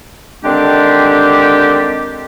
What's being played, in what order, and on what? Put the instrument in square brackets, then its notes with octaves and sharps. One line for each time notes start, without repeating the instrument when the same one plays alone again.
[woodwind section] D3 D#3 G#3 C4 D4 G4